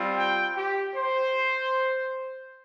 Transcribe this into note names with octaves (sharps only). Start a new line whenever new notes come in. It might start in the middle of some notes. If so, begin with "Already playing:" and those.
Already playing: G3 C4 F4
G5
G4
C5